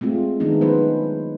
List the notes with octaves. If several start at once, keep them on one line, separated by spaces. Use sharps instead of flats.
G#3 A3 C4 F4
D#3 G#3 A3 B3 D4 D#4
F#3 C#4 B4 C5